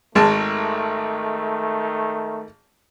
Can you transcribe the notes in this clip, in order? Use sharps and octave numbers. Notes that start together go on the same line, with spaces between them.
G#1 D#3 G#3 A3 A5